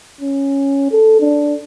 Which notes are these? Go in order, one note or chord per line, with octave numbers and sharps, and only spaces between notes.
C#4
A4
D4